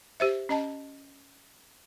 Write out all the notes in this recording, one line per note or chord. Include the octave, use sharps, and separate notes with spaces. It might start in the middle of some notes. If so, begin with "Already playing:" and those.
G4 C5 E5
C#4 D#5 A5